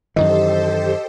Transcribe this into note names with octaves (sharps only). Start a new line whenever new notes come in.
F#2 D#3 E3 G4 A4 C5 D#5